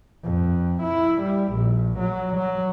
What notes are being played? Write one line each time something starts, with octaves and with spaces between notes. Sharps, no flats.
F2
E4
G3
A#1
F#3
F#3